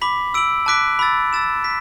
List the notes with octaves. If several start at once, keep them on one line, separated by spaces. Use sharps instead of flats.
B5 D6 B6 F#7
E6 D7 F#7
A5 D6 F#6 B6 D7
B5 E6 A6
E6 A6 E7
B6